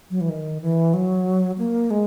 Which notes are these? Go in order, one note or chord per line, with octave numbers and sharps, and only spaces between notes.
F#3
E3
D#3
E3
F#3
A#3
G#3